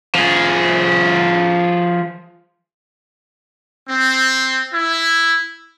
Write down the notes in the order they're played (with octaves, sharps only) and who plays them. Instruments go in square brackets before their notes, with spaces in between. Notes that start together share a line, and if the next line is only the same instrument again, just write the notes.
[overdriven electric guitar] F3 G#4
[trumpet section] C4
E4